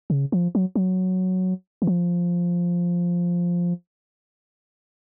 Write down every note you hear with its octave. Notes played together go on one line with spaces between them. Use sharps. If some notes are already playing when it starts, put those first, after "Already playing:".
C#3
F3
F#3
F#3
E3
F3